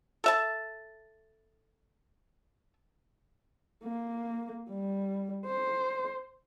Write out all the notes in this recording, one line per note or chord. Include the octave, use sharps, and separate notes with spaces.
A4 E5 A5
A#3
G3
C5